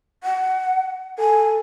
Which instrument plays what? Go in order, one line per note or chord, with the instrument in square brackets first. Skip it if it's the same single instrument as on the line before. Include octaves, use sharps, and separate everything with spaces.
[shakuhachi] F#5
[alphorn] A4 [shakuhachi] G#5